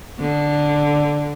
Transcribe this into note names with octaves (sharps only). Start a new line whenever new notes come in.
D3